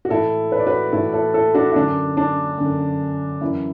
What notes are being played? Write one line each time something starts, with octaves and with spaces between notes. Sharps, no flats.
F#4
A2 E3 E4 A4
B4
D5
F#4 B4
A2 E3 E4 A4
E4 A4
E4 A4
D4 F#4
E4
F#2 D3 D4
D4
F#2 D3
F#2 E3 E4